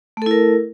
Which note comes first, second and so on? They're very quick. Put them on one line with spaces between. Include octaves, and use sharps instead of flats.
A3 A4 E4 A#4